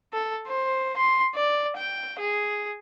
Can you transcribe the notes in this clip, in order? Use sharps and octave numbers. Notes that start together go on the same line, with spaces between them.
A4
C5
C6
D5
G5
G#4